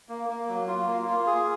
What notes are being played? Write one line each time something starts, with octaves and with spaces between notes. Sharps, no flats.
A#3
A#3
F#3
F4
A#3
F4
G#4